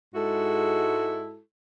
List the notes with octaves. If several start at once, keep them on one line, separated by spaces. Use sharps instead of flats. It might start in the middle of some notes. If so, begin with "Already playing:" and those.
G#2 G#3 E4 F#4 A4